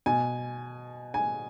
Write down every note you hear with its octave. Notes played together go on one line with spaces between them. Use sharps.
B2 G#5
G#5